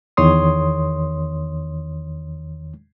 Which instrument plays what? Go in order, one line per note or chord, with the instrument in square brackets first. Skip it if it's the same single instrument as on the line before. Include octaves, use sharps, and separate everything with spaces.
[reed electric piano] E2 D#3 C#5 C6 D#6